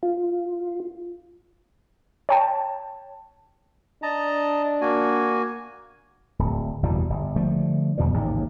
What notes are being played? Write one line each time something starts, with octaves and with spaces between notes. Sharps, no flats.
F4
C#5 G5 A5
D4 D#5 A5 A#5
A#3 F#4 G#5
D1
F#1 E2 B2 G3
G1
D3 F3 G3 A3
E2 B2 F3 G3
A1 D#2 G#2 C#3